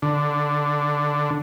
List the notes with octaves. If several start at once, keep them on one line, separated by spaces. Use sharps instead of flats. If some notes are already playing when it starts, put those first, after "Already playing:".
D3